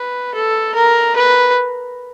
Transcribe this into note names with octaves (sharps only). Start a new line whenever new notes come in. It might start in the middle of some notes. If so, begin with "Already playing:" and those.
Already playing: B4
A4
A#4
B4